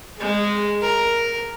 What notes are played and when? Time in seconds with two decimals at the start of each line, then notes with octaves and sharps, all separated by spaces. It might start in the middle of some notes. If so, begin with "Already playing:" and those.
0.17 G#3 G#4
0.82 A#4